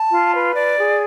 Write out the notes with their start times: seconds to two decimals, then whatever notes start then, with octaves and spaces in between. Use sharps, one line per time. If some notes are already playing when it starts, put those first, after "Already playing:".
Already playing: A5
0.12 F4
0.34 B4
0.55 D5
0.77 G#4